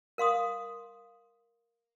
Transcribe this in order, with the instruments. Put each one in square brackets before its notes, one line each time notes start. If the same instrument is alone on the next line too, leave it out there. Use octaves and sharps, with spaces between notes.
[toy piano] A#4 F5 C6 D#6